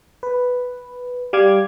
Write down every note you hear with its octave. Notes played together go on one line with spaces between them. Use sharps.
B4
G3 F5 D6 G#6